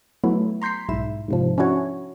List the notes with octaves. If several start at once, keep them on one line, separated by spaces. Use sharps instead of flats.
F#3 A3 B3 E4
A#5 C6 G6 B6 C7
B1 G#2 E4 E7
G#2 C3 F3
C#4 D4 E4 F#4 C#5